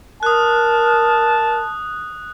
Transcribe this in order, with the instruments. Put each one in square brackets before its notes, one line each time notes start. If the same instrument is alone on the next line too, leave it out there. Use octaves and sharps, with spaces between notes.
[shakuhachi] A#4 [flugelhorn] A5 [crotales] D#6 F#6